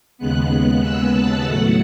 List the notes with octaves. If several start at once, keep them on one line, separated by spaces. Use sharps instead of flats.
D#2 C#3 G#3 B3 F#6
E6
A5
A2 F#3 A3 F#5